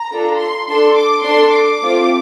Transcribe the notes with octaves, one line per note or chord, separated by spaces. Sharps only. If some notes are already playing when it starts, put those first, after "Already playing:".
Already playing: A#5
D4 F4 A4
C6
D4 A4 C6
D6
D4 A4 C6
D6
A3 C4 F4 A4